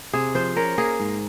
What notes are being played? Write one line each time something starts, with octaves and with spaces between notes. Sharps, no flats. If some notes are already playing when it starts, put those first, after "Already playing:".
C3 G#4
F3 C5
C#4 A#4
A#3 G#4
G#2